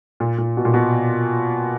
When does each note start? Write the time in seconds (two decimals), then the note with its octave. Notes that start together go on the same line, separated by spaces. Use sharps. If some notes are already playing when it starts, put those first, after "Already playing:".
0.20 A#2
0.38 A#2
0.57 B2
0.65 A#2
0.74 B2